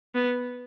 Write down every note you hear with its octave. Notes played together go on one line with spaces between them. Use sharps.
B3